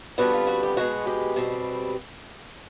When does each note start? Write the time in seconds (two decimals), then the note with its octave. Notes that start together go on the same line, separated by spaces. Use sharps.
0.18 F2 D3 G3 B3 F#4
0.33 F4
0.47 F#4
0.63 G4
0.77 B2 G#3 B3 F#4
1.07 G4
1.36 B2 G3 C4